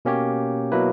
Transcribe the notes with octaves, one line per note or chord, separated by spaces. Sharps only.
B2 A#3 C#4 G4 C#5
B2 F#3 A#3 E4 B4